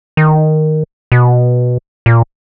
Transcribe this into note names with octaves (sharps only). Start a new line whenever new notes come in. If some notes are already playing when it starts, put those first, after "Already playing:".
D#3
B2
A#2